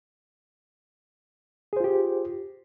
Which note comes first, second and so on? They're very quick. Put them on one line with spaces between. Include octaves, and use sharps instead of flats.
G#4 C5 F4 G4